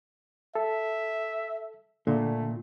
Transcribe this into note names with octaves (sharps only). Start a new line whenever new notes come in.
A4 E5
A#2 D3 A3